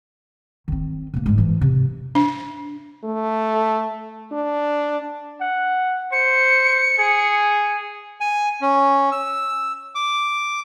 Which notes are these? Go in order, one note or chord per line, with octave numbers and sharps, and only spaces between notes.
D#3 C4
B2 A#3
G#2 G#3
E3 F3
C3
D4
A3
D4
F#5
C5 C#7
G#4
G#5
C#4
E6
D6